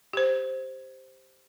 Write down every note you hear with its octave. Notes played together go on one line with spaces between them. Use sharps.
G4 C5